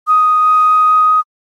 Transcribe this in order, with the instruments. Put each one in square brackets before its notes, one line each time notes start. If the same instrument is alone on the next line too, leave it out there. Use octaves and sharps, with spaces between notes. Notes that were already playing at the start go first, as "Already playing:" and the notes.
[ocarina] D#6